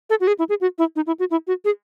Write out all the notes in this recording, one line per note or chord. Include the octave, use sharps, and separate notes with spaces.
A4
F#4
G#4
E4
G#4
F#4
E4
D#4
E4
F#4
E4
F#4
G#4